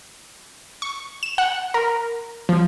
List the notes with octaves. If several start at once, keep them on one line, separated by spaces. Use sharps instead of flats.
C#6
E7
F#5
A#4
F3